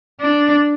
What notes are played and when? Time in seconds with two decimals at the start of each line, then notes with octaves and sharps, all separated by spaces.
0.21 D4